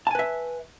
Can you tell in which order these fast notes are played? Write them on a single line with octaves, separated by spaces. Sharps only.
A5 G#5 B4 E5